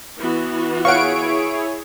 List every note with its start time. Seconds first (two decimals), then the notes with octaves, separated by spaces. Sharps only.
0.17 E3 B3 F#4
0.85 E4 G#4 C#5 F5 F#5 C#6 D7